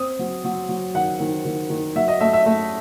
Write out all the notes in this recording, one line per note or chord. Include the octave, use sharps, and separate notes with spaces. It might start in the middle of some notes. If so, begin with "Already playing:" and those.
Already playing: C4 D#6
F#3
F#3
F#3
D#3 F#5
D#3
D#3
D#3
F#3 E5
D#5
A3 E5
E5
A3